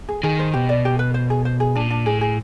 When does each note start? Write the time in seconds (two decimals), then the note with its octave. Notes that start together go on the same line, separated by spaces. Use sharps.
0.09 G#4
0.23 D#3 G#4
0.39 C5
0.54 B2 G4
0.69 D5
0.85 G4
0.99 B4
1.14 C5
1.30 G#4
1.45 C5
1.60 G#4
1.75 A#2 D4
1.90 D4
2.06 A2 G#4
2.21 G#4